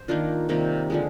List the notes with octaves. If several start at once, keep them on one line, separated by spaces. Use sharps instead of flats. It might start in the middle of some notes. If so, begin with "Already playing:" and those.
Already playing: C5
D#3 A#3 D4 F4
C3 D#3 G3 A#3
D3 F3 G#3